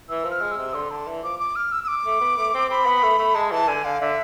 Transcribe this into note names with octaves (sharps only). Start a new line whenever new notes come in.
E3 E6
F3
F6
G#3
E6
C3
D3 C6
D3 A5
E3
F3 D6
D6
F6
E6
E6
D6
A3
B3
A3
C4
C4 B5
B3
A3
A3
G#3 A5
E3 A5
D3 G#5
D3 F5
D3 E5